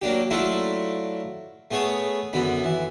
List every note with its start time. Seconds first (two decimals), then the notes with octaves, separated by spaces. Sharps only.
0.02 F#3 A#3 D4 G4
0.30 F#3 A3 D4 E4 F4 A4
1.71 A3 B3 G#4 C#5 A5
2.33 F#2 D3 B3 B5
2.64 E3